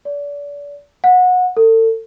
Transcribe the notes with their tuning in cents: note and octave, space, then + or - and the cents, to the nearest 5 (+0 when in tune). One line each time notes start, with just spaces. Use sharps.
D5 -35
F#5 -25
A4 +35